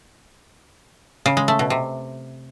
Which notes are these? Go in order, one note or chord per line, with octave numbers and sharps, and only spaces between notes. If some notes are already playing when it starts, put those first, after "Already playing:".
C#3
G#3
A3
B2
C3